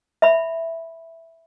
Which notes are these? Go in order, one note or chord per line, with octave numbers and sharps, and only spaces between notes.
E5 B5